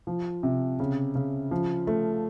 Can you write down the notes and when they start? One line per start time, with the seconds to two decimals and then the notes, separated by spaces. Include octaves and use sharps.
0.07 F3
0.43 C3
0.80 C#3
1.15 C#3
1.51 F3
1.87 A3